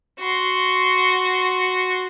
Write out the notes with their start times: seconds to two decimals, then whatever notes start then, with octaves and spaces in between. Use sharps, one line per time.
0.20 F#4 C6